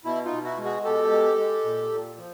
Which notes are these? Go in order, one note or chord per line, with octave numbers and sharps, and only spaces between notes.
B2 E4
D#4 F4
B2
E4 F#4
G#3
F#4 G#4
B2 G4 A4
G#3
G#3
A#2
A#2
F3